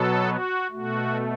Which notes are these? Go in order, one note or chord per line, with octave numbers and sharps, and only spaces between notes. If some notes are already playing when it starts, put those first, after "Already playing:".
Already playing: B2 F#3 B3 A4
F#4
A3 F#4
B2